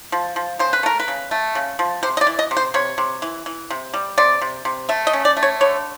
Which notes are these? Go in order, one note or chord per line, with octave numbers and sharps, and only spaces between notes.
F3
F3
C#3 C5
B4
A3 A#4
B4
C#3
A3
C#3
F3
C3 C5
D#5
D5
E3
D#5
C3
C5
C3 C#5
C3
E3
E3
C3
G3
C3 D5
C3
C3
A3 E5
D#5
C#4
D5
A3
C#5
D3 C#5